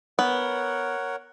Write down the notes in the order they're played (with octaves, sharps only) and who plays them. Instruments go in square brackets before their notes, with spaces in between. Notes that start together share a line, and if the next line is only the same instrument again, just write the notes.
[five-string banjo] B3 [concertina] A#4 C#5 F#5